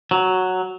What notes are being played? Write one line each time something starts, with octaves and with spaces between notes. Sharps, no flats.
F#3